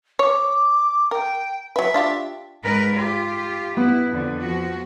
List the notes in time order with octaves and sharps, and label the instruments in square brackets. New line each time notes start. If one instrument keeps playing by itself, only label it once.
[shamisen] C#5 [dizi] D6
[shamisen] A#4 [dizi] G5
[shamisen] F#3 B4 [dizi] E5
[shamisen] D4 F4 G4
[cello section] G#2 A#4 B4
F4 G4
[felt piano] B3 [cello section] E4
[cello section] F2 D3
F3 F#4